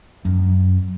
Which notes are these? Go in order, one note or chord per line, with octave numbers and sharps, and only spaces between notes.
F#2